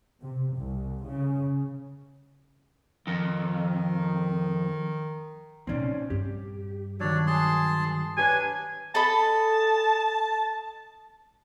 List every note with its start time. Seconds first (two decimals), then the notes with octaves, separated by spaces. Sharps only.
0.22 C3
0.57 C2
1.05 C#3
3.07 F2 D#3
5.67 A#2 C4 C#4 D#4 D5
6.10 G2 G4
7.00 D#3 F#3 D4 C#5 D5
7.27 G#4 A5 C6
8.18 D4 G4 B4 C#5 G#5
8.95 A4 D#5 A5 B5